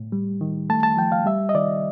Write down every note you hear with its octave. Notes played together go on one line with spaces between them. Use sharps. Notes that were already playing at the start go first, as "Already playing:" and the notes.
Already playing: A2
G3
D#3
A3 A5
A5
F3 G5
F5
G3 E5
D#5
D#3 D5